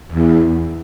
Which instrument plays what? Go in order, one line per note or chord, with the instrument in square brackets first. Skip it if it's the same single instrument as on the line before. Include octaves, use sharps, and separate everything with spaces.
[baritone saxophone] E2